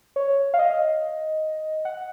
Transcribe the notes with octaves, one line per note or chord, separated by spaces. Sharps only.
C#5
F5
D#5
F#5